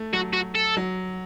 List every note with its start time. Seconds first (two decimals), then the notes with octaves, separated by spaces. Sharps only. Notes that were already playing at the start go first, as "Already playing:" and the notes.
Already playing: A3
0.13 F#3 F#4
0.34 F#4
0.55 A4
0.77 F#3